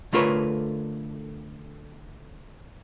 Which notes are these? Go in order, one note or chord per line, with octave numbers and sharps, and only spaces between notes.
D3 A3 F4 A#4 B4 C#5